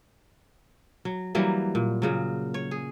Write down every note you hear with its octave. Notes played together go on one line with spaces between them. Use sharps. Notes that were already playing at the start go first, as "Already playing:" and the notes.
F#3
E3 F#3 G3 A#3
A#2
A#2 C#3 F#3
C#5
G#4